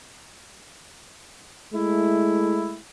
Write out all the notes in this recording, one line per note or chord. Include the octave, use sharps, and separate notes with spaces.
G#3 A3 E4